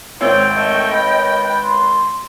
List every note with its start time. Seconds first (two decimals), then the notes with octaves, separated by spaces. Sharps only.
0.21 G#1 C4 C5 C#5 G5 E6
0.55 A3 D#5
0.91 B4
1.63 C6